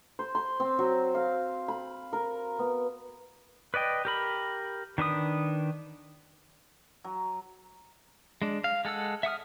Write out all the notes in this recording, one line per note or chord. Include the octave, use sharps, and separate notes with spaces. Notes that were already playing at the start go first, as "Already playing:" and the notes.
C5
C6
C4
F#3
F5
B5
A#4
B3
B4 D5 D#5 G5
G4 A#4 B5
D#3 D4 B4 D#6
F#3
G#3 D4
F5
G#3 A4 F#5 E6
E5 F#5 D#6 F6